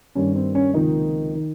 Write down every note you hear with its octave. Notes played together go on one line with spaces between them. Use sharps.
G2 D#3 G3 A#3 C#4
C4
C#4
C#2 C3 D#3 F3 A#3 D#4
D#3